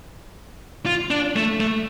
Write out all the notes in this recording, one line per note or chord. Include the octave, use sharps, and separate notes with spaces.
F4
D4
A3
A3